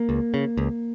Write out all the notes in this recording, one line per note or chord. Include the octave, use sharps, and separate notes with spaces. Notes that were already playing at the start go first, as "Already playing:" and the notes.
Already playing: A#3
C#2
C#3
C#2